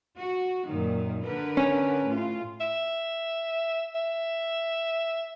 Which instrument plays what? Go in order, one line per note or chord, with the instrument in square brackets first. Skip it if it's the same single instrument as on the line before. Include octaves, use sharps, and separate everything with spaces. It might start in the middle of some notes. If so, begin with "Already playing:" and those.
[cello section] F#4
F#2 A#2 D#3
D3 A#4 B4
[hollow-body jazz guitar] C#4
[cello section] A2 F4
[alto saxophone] E5
E5